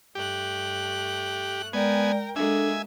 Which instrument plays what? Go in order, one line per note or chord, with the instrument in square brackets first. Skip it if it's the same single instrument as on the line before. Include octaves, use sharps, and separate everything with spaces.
[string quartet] G2 A3 F#6 [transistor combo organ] G4
[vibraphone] G#3 D5 [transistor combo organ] B3 G#5 [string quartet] A#4 G5
[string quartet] G#3 A#3 F#4 [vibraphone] D4 A4 [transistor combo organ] E5 G#5